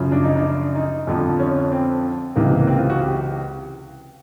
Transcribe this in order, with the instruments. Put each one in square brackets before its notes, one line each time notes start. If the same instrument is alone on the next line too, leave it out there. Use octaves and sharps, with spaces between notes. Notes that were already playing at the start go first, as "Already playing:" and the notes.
Already playing: [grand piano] F#2 C#3 F3
D4
D#4
D4
D#4
F2 D3 F3
C#4
C4
C#2 C3 E3 A#3
C4
F4
F#4
G4